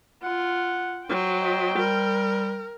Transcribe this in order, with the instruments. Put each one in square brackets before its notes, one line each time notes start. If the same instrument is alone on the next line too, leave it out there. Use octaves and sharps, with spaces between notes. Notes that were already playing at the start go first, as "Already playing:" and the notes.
[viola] F4 [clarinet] F#5
[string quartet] F#3 [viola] C5 G5
[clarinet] D#5
[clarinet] G3 [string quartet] A#4